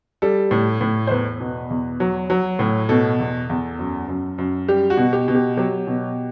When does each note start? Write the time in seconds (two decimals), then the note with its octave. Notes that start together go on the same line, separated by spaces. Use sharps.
0.22 G3 A4
0.51 A2
0.81 A2
1.07 C5
1.11 E2 B4
1.40 B2
1.70 E2
2.00 F#3
2.30 F#3
2.59 A2
2.89 B2 A4
3.20 E2
3.49 E2
3.79 F#2
4.08 F#2
4.38 F#2
4.68 G3 G4
4.90 F#4
4.97 B2
5.13 G4
5.28 B2
5.35 G4
5.57 F#3 G4
5.87 B2